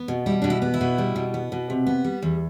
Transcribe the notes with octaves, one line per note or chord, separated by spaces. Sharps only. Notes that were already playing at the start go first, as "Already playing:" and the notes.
Already playing: B3
B2
G3 E4
B2 D4
E4
B3
E4
B2
G3
B2
B3
B2
C3
B3
G3
E2